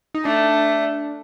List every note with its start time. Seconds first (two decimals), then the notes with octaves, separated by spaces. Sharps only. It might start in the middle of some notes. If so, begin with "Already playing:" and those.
0.15 D#4
0.25 A3 D4